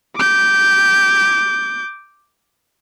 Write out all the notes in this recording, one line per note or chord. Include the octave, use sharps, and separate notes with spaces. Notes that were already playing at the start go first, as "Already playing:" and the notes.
D6 G6